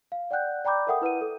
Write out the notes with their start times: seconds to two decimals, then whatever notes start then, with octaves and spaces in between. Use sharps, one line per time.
0.12 F5
0.31 D5 F#5 G5 F#6 G6
0.65 D5 G5 A#5 B5 D6 G6
0.87 A4 A#4 E5 F#5 G5 D#6
1.02 E4 B4 F#5 D#7
1.21 A4